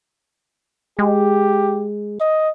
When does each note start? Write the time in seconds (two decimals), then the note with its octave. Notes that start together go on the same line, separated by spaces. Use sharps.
0.99 G#3 G4
2.20 D#5